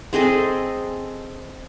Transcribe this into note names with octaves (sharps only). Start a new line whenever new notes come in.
C4 G#4 A4 D#5